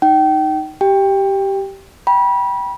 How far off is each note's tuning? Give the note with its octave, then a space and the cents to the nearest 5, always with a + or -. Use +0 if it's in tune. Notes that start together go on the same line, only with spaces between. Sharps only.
D#4 +0 G5 -30
G4 -10 G5 +20
G5 +0 B5 -25